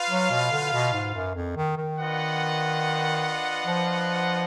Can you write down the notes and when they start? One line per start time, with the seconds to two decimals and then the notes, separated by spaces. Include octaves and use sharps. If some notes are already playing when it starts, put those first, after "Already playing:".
Already playing: F4 B4 F5
0.10 F#3
0.30 B2
0.52 D3
0.73 B2
0.93 G#2
1.15 F#2
1.35 F2
1.57 D#3
1.78 D#3
1.99 D4 F4 B4 D#5 F#5
3.65 F3